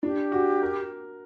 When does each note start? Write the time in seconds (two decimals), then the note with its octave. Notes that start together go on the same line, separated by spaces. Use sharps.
0.03 D4 G4
0.32 F#4
0.62 A#4